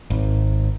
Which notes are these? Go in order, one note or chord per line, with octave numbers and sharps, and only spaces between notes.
G#1